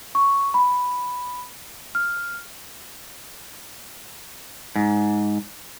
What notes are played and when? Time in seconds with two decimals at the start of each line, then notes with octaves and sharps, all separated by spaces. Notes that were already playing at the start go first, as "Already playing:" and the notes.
0.15 C#6
0.54 B5
1.95 F6
4.76 G#2